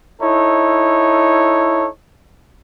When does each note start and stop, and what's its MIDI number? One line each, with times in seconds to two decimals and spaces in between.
0.21 1.88 63
0.21 1.88 64
0.21 1.88 69
0.21 1.88 73